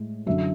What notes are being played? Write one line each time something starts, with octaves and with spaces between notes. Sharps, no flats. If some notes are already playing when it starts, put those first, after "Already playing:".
Already playing: A2 G#3
F#2 D3 F#3 E5